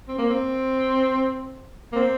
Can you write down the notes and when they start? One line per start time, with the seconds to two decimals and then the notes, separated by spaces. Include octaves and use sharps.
0.08 C4
0.18 A#3
0.30 C4
1.93 A#3
1.96 C4